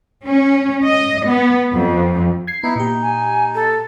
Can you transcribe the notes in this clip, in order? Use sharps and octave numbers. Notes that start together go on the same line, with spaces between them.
C#4
D#5
B3
F2
G#6 C7
B3 D#4 E4
A#2 D#4 G4
G#5
A4